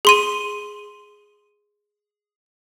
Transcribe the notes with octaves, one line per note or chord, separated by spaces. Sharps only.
G#4 C6 D#7